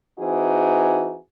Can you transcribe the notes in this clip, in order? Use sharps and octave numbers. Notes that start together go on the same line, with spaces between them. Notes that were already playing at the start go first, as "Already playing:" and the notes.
E3 C4 D#4 F#4 G#4